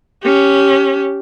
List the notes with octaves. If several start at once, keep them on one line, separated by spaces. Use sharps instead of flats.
C#4 G4